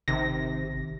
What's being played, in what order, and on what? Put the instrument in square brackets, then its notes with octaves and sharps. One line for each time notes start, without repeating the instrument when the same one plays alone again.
[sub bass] G#1 [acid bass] C3 [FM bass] D#3 [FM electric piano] A#6